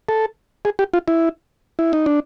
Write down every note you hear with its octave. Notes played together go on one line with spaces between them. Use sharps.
A4
G#4
G4
F4
E4
E4
D#4
D4